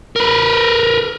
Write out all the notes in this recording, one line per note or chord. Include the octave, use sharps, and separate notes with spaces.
A#4 B4